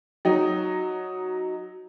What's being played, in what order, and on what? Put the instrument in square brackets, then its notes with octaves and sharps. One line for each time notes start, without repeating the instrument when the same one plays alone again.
[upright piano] F#3 D#4